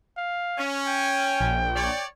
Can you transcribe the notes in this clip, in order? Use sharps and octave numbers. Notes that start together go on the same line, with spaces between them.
F5
C#4
G5
A#1
C#5 D5